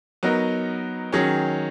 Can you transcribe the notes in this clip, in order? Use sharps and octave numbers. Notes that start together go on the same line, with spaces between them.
F#3 B3 D#4 A#4
D#3 F#3 C#4 G#4